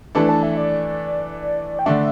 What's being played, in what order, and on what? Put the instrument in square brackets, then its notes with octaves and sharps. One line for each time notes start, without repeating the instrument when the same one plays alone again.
[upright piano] E3 A3 D4 A4 [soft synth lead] B4
[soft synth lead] A5
E5
D5
G5
[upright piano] D3 A3 D4 [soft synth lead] E5